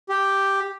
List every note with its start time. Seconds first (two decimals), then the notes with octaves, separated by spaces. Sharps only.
0.09 G4